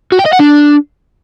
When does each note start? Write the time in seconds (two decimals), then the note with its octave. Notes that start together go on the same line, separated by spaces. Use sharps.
0.12 F#4
0.19 G5
0.26 D#5
0.33 F#5
0.40 D4